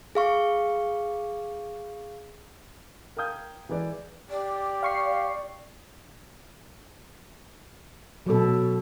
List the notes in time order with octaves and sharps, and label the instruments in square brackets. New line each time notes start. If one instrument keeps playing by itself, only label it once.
[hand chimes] G#4 F5 C#6
[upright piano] A#4 F5 G5 D#6 G6 G#6
E3 G#3 B4 D5
[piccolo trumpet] G4 [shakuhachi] D5
[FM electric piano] F5 C#6 C7
[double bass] B2 [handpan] F#3 A4